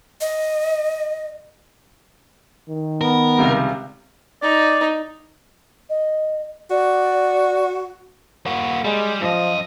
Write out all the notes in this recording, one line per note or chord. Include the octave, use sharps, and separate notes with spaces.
D#5
D#3
B3 A#4
C#2 C3 G3
D#4 D5
D#5
F#4 D5
A#3 F#4
G3 G#3
F#2 F3 D#5